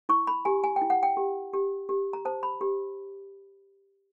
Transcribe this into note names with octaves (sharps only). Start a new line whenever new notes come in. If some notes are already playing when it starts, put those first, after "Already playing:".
E4 C#6
B5
G4 G#5
G#5
G5
E4
F#5
G5
G4
G4
G4
A#5
C5 A5
B5
G4